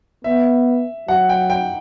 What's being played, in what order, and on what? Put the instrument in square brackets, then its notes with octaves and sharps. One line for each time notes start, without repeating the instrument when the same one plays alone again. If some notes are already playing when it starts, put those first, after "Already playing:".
[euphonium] B3 [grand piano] E5
[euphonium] F#3 [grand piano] F#5
[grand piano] G5
G5